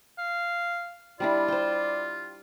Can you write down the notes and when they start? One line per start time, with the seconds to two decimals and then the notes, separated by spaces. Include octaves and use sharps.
0.18 F5
1.20 G3 D4 E4 F4 D5
1.48 C5 G5